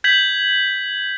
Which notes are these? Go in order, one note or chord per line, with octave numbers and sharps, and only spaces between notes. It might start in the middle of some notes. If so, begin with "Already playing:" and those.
G6 G#6 B6 F#7